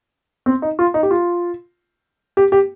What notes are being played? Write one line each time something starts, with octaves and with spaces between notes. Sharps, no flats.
C4
D#4
F4
D#4
G4
F4
G4
G4